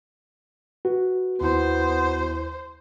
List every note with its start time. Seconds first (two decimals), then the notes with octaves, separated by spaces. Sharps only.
0.85 F#4 B4
1.41 D#2 B3 E4 C5